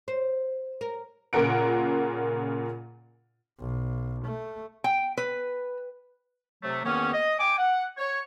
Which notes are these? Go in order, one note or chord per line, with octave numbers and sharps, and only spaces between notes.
C5
A#4
A#2 C#3 F4 A#4 F#5 D7
B1
A3
G5
B4
C3 F#3 A3
E2 D#3 A#3 B3 C#4
D#5
G5 G#5 D6
F#5
C#5